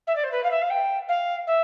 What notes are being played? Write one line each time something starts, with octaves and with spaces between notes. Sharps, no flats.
E5
D5
C5
B4
F5
E5
F5
G5
F5
E5